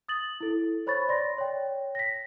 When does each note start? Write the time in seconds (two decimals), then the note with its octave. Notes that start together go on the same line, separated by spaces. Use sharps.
0.08 D#6 A6 F#7
0.40 E4 A4
0.87 C5 C#5 B5 C#6 A6
1.09 D5 C6 A#6
1.38 C#5 G5
1.95 A#6 B6